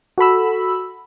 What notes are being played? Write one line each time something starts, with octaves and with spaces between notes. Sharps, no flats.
F#4 A4 B5 E6